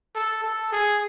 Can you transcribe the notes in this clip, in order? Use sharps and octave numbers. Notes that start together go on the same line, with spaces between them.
A4
A4
G#4